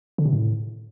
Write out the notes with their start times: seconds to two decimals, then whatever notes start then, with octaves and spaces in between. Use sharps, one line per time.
0.18 D3
0.25 C3
0.33 A2